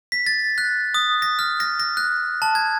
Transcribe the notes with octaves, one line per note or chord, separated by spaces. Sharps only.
B6
A6
F#6
D#6
A#6
F6
A#6
A#6
F#6
A5
G#6